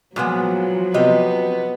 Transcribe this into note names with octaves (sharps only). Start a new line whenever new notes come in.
A#2 F3 F#3 G#3 B3
C3 B3 G4 D#5